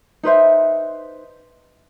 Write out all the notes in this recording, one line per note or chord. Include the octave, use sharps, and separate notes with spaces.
D#4 B4 C5 E5